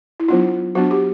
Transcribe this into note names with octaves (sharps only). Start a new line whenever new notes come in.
E4
F#3 B3 D4 F4
F#3 B3 D4 F#4
G4